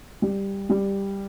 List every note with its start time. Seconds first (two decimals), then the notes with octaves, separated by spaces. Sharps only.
0.22 G3
0.70 G3